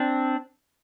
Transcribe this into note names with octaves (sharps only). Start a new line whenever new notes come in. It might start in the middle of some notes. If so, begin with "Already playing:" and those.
Already playing: C4 D4